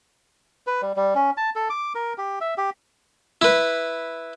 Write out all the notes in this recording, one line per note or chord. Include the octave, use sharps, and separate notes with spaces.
B4
G3
G3
C#4
A5
A4
D6
A#4
G4
E5
G4
E4 B4